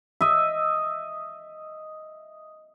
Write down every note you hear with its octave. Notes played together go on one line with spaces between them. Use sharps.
D#5 E5